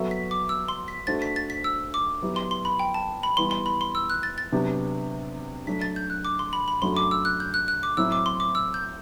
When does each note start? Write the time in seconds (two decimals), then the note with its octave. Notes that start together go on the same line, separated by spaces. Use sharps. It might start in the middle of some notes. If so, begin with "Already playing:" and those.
Already playing: F#3 B3 F#4 A4 E5
0.11 B6
0.31 D6
0.49 E6
0.68 C6
0.88 B6
1.07 A3 D4 F#4 C5 A6
1.22 B6
1.36 A6
1.50 B6
1.64 E6
1.94 D6
2.22 F#3 B3 E4 G4
2.36 C6
2.51 C6
2.65 B5
2.79 G5
2.94 A5
3.23 B5
3.37 E3 G3 B3 C6
3.51 C6
3.66 B5
3.81 C6
3.95 E6
4.10 F#6
4.23 A6
4.38 A6
4.52 C3 F#3 B3 D4 G4
5.67 F#3 A3 D4 B6
5.81 A6
5.96 G6
6.10 F#6
6.25 D6
6.39 C6
6.53 B5
6.68 B5
6.82 F#2 F#3 A3 D4 F#4 C6
6.97 D6
7.11 E6
7.25 F#6
7.40 G6
7.54 F#6
7.68 F#6
7.83 D6
7.97 A2 F#3 C4 E4 E6
8.12 D6
8.26 C6
8.40 D6
8.55 E6
8.74 G6